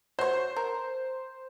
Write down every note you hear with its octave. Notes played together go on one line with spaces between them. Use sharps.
F#4 C5 C#5
A#4